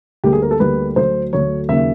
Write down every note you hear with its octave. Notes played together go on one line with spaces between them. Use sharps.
D2 D3 G3 A#3 G4
G#4
A#4
A4
D2 D3 G3 A#3 B4
D2 D3 F#3 C5
D2 D3 F#3 C#5
D#2 C#3 F#3 A#3 E5